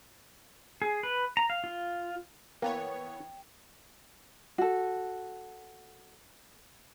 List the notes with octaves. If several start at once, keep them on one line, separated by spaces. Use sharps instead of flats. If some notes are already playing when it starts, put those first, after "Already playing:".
G#4
B4
A#5
F5
F4
E3 A#3 B3 C#5 G5
F#4 A4